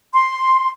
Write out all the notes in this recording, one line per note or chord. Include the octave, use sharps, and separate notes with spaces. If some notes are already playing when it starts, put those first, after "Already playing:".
C6